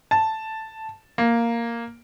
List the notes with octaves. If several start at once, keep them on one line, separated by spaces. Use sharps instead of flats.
A5
A#3